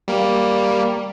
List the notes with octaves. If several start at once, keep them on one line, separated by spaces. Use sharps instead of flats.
G3 A#3